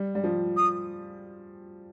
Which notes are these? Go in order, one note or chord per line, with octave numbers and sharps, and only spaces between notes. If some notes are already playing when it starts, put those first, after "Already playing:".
Already playing: G3
G3
F3
D#6